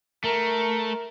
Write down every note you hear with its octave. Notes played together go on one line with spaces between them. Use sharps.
A3 A#4